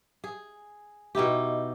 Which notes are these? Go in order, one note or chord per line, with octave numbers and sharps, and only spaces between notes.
G#4
B2 D#4 E4 G4